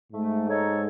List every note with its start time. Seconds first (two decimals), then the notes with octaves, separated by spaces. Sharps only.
0.12 G#2 A3
0.48 D#4 A4 C#5